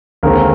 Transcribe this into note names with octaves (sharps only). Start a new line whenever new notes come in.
D#2 D3 G#3 C4 A#4